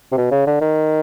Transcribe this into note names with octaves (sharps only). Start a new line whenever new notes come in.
C3
B2
C#3
D3
D#3